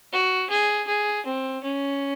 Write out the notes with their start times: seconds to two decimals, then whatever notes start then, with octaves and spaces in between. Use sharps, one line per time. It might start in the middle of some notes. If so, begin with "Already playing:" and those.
0.12 F#4
0.50 G#4
0.87 G#4
1.26 C4
1.64 C#4